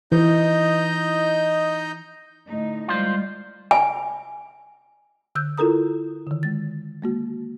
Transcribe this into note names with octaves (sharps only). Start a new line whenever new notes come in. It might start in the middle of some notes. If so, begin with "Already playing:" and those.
E3 D#4 E4 D#5 G6
A2 D3 D#4
G3 G#3 F4 C5
G#5
D3 E6 F#6 G6
E4 F4 A4 A#4 A#5 D#6
D3 D#3
G#3 A6
G#3 A#3 F#4